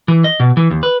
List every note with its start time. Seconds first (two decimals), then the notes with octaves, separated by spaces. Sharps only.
0.08 E3
0.24 D#5
0.40 B2
0.57 E3
0.71 D#2
0.83 B4